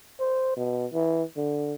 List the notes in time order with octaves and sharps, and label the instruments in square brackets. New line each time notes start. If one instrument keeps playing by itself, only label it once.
[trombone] C5
B2
E3
D3